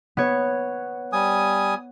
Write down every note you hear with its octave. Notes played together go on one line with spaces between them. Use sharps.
B3 C#5
G3 G#5 D#6